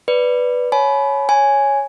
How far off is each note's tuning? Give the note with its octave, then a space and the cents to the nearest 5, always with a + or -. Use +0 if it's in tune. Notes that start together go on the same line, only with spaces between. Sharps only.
B4 +0 D5 +0
C#5 +0 G#5 +40 B5 +0
C#5 +0 G#5 +0